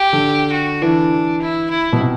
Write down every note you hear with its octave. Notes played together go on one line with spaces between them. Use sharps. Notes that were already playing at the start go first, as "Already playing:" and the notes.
Already playing: G4
D3
F#4
E3 D4
E4
E4
B2
C3